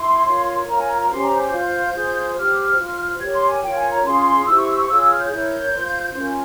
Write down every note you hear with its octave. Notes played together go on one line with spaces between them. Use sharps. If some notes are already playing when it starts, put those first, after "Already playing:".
Already playing: E4 C6
F4 A#4 C#5
F4 A#4 C#5 A#5
G#5
A#5
A#5
C#4 G4 C5 C6
A#5
G6
F4 C5 G6
F4 G#4 C5
G4 C5 F6
F4 C5
G4 A#4 C#5 G#6
C6
G#5
F4 A#4 C#5 G5
G#5
A#5
C#4 F4 G#4 C6
E4 G4 C5 E6
C#6
E6
C#6
F4 G#4 C#5 E6
E6
F6
G6
E4 A#4 C#5 G6
F4 C5
C#4 F4 A#4